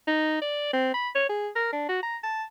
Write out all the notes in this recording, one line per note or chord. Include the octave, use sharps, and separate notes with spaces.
D#4
D5
C4
B5
C#5
G#4
A#4
D4
F#4
A#5
A5